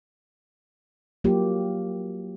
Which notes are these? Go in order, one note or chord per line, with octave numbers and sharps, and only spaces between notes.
F#3 A#3 F4 G4